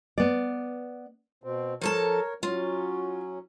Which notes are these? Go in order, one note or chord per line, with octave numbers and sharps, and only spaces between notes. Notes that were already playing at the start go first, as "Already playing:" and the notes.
B3 D5
B2 C4
F3 A4 A#4 C#5 A5
F#3 C#4 F4